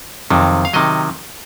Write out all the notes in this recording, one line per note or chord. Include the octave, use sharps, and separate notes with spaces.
F2 C3 D#3 F#3
F5
C3 D#3 F#3 D#5